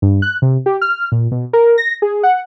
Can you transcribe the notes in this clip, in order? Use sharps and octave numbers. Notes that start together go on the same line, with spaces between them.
G2
F#6
C3
G4
F6
A#2
B2
A#4
A#6
G#4
F#5